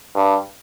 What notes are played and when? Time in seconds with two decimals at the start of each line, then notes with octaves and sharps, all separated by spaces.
0.15 G2